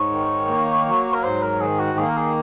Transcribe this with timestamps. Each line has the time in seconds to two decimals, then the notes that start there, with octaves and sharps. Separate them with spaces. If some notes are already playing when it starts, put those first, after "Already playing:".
Already playing: G#2 C#5
0.11 D#3
0.48 A#3
0.86 F#3
1.14 A#4
1.23 G#2 C5
1.42 A#4
1.61 D#3 G#4
1.80 F#4
1.98 A#3 G#4
2.09 A#4
2.17 G#4